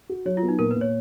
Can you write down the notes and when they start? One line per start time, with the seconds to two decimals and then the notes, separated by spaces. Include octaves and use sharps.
0.09 F#4
0.25 F#3 C#5
0.37 F4
0.43 B3
0.48 D#4
0.59 A#2 A#4
0.71 B4
0.76 A#2
0.81 C#5